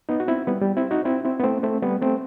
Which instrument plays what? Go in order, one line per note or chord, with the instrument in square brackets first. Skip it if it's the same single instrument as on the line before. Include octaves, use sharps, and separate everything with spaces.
[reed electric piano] B3 D#4
F#4
C4 E4
G3 B3
G3
C4 E4
D#4 F#4
C4 E4
C4 E4
B3
A3 C4
A3 C4
G3 B3
A3 C4